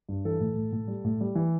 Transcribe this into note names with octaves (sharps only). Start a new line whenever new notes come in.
G2
E3 A4
A2
A2
A2
G3
A2
G3
E3